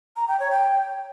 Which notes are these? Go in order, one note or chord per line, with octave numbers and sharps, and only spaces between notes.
A#5
G5
C#5
G5